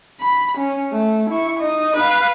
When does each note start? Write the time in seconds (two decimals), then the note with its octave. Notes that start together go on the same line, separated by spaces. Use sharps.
0.20 B5
0.57 C#4
0.92 A3
1.30 E4 C#6
1.60 D#4 D#5
1.96 B4 F5